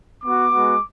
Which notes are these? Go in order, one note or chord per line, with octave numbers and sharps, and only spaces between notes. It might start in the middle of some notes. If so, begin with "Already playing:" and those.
B3 F#4 D6
G#3 B3 F#4